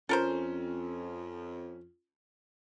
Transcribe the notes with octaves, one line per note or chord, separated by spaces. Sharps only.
F2 C#4 F4 A4 A#4 C5